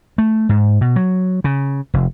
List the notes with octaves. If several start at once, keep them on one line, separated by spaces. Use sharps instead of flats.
A3
G#2
B2
F#3
C#3
F1